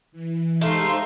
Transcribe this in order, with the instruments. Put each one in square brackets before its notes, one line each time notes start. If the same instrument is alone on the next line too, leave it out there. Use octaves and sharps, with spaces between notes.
[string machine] E3
[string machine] G#3 G4 C5 [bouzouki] A3 [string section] D#4 F5 C6